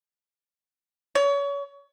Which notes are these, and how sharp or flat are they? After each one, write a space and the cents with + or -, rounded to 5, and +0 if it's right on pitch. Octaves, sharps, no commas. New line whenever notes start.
C#5 +30